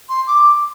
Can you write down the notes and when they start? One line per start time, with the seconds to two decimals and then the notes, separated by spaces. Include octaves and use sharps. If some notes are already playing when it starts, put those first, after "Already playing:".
0.09 C6
0.27 D6